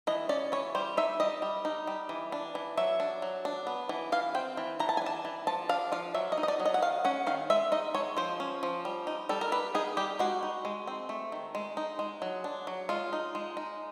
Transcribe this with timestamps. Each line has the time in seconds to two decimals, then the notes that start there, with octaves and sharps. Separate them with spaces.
0.07 E3 D#5
0.29 C#4 D5
0.52 E3 C#5
0.75 G3 C5
0.97 D#4 E5
1.20 G3 D#5
1.42 G3
1.65 D#4
1.87 G3
2.09 E3
2.32 D4
2.55 E3
2.77 F#3 E5
3.00 D4
3.22 F#3
3.45 D4
3.67 B3
3.89 E3
4.12 E3 F5
4.35 C4 G5
4.57 E3
4.80 E3 A#5
4.89 A5
4.97 G#5
5.02 D4 A5
5.25 E3
5.47 F3 A5
5.69 D4 F5
5.92 F3 F5
6.14 F#3 E5
6.32 D#5
6.38 D#4
6.43 D#5
6.48 D5
6.60 F#3
6.65 D#5
6.74 F#5
6.82 D#3 F5
7.05 C#4 F#5
7.27 D#3 F5
7.50 G#3 E5
7.72 D#4 D#5
7.94 G#3 C#5
8.17 F3 C5
8.40 C#4
8.63 F3
8.85 G3
9.07 D#4
9.29 G3 A4
9.41 A#4
9.52 G3 B4
9.75 D#4 G#4
9.97 G3 G4
10.19 G#3 F#4
10.43 D#4
10.65 G#3
10.87 C4
11.09 A3
11.32 D#3
11.55 G#3
11.77 D#4
11.99 G#3
12.22 F#3
12.44 D4
12.67 F#3
12.89 G#3 F4
13.13 D#4
13.35 G#3
13.57 D#4